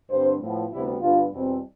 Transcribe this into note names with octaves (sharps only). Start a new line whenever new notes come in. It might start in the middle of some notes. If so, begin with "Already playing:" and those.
G2 D3 G3 C4 C5
A2 F3 B3
D2 C3 G3 B3 E4
G2 D3 G3 B3 F4
E2 B2 G3 C4